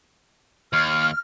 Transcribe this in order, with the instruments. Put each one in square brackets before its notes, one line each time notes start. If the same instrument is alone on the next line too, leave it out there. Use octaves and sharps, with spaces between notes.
[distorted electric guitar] D#2 [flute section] F6